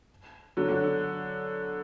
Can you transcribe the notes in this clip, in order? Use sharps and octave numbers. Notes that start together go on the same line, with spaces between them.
D3 F#3
D3 F#3